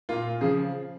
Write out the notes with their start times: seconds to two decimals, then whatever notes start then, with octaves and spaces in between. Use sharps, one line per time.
0.09 A#2 A#3 F4
0.41 C#3 F3 G#4